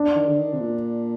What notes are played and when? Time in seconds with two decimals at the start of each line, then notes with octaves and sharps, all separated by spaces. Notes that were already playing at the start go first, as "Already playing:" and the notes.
Already playing: D4
0.15 D#3
0.28 D3
0.39 D#3
0.53 C3
0.60 A#2